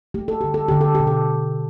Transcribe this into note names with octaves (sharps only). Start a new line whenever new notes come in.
A3 G4
A4
D3 G4
A4
D3 G4
A4
B2 G4
A4